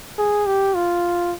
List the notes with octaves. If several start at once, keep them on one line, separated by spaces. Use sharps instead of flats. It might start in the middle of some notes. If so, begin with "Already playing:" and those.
G#4
G4
F4